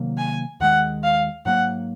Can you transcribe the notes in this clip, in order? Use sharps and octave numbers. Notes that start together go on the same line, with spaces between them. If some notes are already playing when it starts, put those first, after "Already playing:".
Already playing: C3 D#3 F#3 A#3
G#5
D#2 D#3 G#3 F#5
F5
G#2 F#3 A#3 F#5